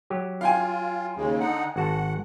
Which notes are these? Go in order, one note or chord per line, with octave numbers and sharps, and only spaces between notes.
F#3 G4
F4 F5 G5 G#5
D#2 C#3 G#3
D3 D#4 F#5
G#1 F#4 F#5 A5